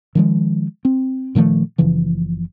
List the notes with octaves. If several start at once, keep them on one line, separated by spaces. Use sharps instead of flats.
D#3 F3 G#3
C4
A#2 D#3 F3 A3
F#1 C#3 E3 F3